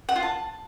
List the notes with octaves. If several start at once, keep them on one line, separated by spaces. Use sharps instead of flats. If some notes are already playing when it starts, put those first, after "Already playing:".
F#5
F4
A5